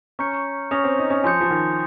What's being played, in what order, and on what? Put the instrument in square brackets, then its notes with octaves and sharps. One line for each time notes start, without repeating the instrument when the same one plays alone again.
[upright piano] C#4 [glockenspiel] A#5 C#6 G6 C#7
[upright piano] C#4 [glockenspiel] D#6 A#6 F7
[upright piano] C4
D#4
C#4
[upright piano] F3 [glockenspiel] G#5 C6 D#6 G6 C#7
[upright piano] F3
D#3